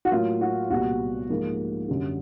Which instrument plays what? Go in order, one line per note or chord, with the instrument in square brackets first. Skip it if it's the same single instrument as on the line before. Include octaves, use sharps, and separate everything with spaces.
[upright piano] F#4
A2 F#3 A#3 F4
F#4
C2 A#2 G3 B3 F#4
G#2 F3 A#3
F#2 D3 G3